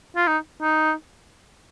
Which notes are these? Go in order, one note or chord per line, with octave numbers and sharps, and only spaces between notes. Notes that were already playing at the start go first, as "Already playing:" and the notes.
F4
D#4
D#4